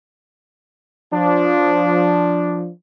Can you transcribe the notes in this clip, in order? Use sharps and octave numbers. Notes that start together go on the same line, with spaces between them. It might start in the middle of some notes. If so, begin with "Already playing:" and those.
F3 D4